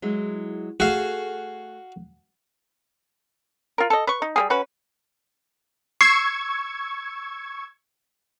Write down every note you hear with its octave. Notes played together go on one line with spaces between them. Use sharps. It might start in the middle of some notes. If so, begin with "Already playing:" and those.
F#3 G#3 E4
A3 F#4 G#4 F5
F4 A#4
A4 D#5
B4 C#6
D#4
G3 A#3 G#4
C#4 F#4 B4
C#6 E6 G#6 C7